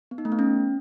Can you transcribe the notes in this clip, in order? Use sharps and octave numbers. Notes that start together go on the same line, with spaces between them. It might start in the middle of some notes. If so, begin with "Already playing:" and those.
B3
D#4
A3
B3
C#4